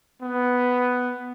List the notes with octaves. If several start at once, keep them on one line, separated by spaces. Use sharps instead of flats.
B3